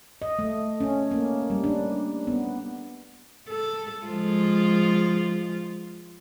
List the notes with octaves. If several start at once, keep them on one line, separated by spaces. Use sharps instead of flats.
D#5
A3
C#4
A#3
G3
D4
B3
A4
F3 G#3 F4